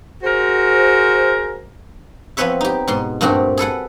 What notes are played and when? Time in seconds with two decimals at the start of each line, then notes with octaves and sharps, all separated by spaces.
0.23 F#4 G#4 A#4 C5
2.37 F3 B3 C4 B4 C#5 E5
2.61 D#4 G4
2.88 G#2 B2 C6
3.21 G2 A#2 A3 C4 F#4 G4
3.58 G#4 A4 B4 F#5